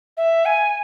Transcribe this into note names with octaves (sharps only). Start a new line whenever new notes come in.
E5
G#5